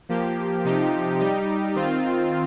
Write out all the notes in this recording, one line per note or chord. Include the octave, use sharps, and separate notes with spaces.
F3 A#3 G4
C3 F3 D#4 G4
G3 D#4 G4
D#3 C4 F4